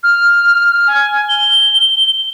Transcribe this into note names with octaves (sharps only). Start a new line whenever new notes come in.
F6
G#5
G7